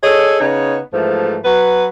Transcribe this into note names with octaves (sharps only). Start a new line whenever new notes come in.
G#4 A4 C#5 D#5
C#3 B3 D#4 C#5
G#2 E3 F3 A3
F#3 F#4 B4